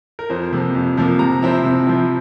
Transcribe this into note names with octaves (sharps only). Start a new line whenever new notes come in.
A#4
F2 C5
C3 F3 A#3
F2
C3 F3 A#3
C3 A#5
F3 C4 E4
C3
F3 C4 E4